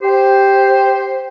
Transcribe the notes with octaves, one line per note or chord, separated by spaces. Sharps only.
G4 C5